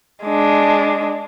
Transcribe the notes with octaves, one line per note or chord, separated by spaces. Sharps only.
G#3 D4